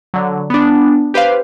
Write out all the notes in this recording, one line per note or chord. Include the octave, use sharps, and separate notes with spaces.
D3 F#3
B3 D4
G4 B4 C5 F5